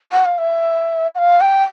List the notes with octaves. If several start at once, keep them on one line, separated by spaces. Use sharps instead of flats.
F#5
F5
E5
F#5
F5
G5